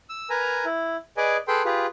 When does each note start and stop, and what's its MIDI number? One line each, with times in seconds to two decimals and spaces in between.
0.10 0.29 88
0.30 0.65 70
0.30 0.65 71
0.30 0.65 80
0.30 0.65 82
0.65 0.96 64
1.17 1.37 68
1.17 1.37 71
1.17 1.37 74
1.17 1.37 75
1.17 1.37 80
1.48 1.62 68
1.48 1.62 69
1.48 1.62 71
1.48 1.62 79
1.48 1.62 84
1.65 1.86 65
1.65 1.86 67
1.65 1.86 68
1.65 1.86 71